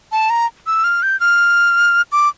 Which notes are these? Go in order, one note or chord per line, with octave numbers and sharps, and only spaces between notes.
A5
A#5
E6
F6
G6
F6
D6